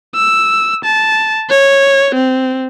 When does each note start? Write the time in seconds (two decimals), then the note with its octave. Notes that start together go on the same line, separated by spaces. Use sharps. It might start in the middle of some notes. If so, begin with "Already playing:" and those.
0.15 E6
0.84 A5
1.50 C#5
2.15 C4